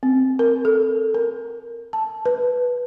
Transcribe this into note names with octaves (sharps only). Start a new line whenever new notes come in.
C4
A#4
A4
A#4
A5
B4